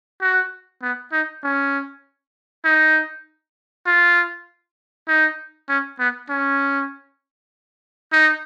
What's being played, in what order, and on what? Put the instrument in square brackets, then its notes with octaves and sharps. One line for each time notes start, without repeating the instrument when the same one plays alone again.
[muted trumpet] F#4
B3
D#4
C#4
D#4
F4
D#4
C#4
B3
C#4
D#4